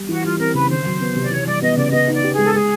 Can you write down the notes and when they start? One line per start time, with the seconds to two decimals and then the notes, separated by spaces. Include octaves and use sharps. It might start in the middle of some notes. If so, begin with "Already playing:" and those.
Already playing: G3
0.09 E3 F#4
0.24 G3 F4
0.39 C4 A#4
0.54 C#3 B4
0.70 D#3 C5
0.86 F#3
1.01 B3
1.16 C3
1.21 D5
1.31 E3 C#5
1.46 G3 D5
1.62 B3 D#5
1.77 C#3 D5
1.92 B3 D#5
2.08 D#4
2.13 D5
2.23 G4
2.34 G#3 G#4
2.43 A4
2.54 G#3 G#4